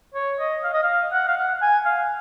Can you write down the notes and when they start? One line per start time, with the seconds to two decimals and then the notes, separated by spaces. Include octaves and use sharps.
0.14 C#5
0.40 D#5
0.64 F5
0.74 D#5
0.83 F5
1.13 F#5
1.28 F5
1.37 F#5
1.62 G#5
1.85 F5